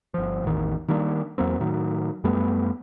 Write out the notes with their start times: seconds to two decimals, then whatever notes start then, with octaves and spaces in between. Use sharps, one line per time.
0.14 G1 F3
0.44 A1 E2 D#3
0.88 D#3 G3 A#3 D4
1.38 E2 F#3 A#3 C4
1.60 A2 D#3 F#3
2.24 F#2 G3 A3 B3